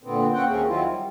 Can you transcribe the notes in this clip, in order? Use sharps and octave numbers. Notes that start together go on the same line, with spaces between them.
A#2 D3 B3 C4
A#3 C4 C#4 F#5 G5
D#2 G#3 A#3 C4 C#4
D#3 F#3 C4 E4 F4
G3